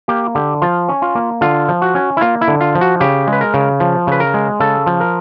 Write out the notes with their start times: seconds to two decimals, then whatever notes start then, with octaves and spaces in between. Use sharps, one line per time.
0.08 A#3 G4
0.35 D3 G4
0.62 F3 F4
0.89 C#4
1.02 F4
1.15 A#3
1.41 D3 F4
1.69 F3
1.82 F#4
1.95 C#4
2.17 E4
2.21 A#3 F4
2.41 E4
2.48 D3
2.61 F4
2.75 F3
2.81 F#4
3.00 C#3 G4
3.27 G#3
3.33 B4
3.41 A#4
3.54 C#3
3.80 F3
4.07 C#3 B4
4.20 A#4
4.34 G#3
4.60 C#3 A4
4.86 F3
5.00 A#4